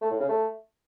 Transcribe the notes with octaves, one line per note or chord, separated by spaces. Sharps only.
A3
A2
C#3
A3